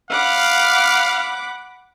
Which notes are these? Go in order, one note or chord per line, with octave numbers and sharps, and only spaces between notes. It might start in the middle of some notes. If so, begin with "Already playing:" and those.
F5 F#5 B5 D6